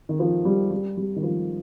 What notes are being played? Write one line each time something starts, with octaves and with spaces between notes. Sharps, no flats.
D#3
F3
G3
G3
G3
D#3
F3